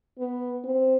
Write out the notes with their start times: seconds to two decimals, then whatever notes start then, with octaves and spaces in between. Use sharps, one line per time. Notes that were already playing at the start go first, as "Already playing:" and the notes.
0.19 B3
0.64 C4